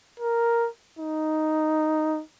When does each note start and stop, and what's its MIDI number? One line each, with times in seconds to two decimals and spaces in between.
0.20 0.68 70
0.99 2.21 63